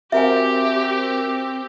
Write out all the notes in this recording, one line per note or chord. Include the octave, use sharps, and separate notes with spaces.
C4 F#4 G4 A#4 C5 E5 G#5